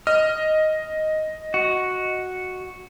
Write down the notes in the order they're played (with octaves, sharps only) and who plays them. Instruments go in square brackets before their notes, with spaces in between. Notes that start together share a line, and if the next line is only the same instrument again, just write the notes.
[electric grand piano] D#5 [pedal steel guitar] F6
[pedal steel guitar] F#4